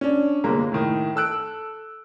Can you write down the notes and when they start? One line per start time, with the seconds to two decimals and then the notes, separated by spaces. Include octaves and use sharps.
0.01 C#4 D4
0.44 G1 A#2 G#3 A#3 A#5
0.72 A2 D#3
1.16 A4 E6 F#6 D7